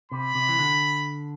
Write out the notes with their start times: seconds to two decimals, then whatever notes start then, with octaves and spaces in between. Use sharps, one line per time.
0.11 C3 B5
0.35 C3
0.49 E3
0.59 D3